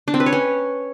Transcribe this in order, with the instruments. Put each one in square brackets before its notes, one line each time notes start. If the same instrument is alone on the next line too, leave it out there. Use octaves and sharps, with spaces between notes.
[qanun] D4
C4
B4
C#5
C#4